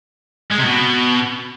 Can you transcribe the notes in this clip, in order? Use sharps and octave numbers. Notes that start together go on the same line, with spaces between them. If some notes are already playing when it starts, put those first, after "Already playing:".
G#3
C3
B2